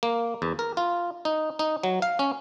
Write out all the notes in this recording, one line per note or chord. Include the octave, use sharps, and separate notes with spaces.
A#3
E2
A#4
F4
D#4
D#4
F#3
F5
C#4